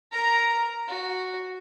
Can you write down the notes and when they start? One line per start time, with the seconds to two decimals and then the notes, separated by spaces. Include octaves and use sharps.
0.12 A#4 A#5
0.88 F#4